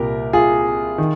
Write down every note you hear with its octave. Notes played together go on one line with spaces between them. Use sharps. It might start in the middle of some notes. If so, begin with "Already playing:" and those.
Already playing: C2 A#2 G4 A#4
F4 G#4
D#3